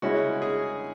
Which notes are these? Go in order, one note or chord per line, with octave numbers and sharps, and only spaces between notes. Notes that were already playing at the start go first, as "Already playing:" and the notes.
C#3 G#3 C#4 E4 F#4
G#4